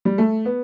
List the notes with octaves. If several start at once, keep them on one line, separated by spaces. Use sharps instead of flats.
G3
A3
B3